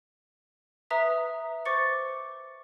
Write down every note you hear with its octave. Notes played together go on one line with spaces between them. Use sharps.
B4 E5 A#5 D#6 B6
C5 C#6 D6 A6 C#7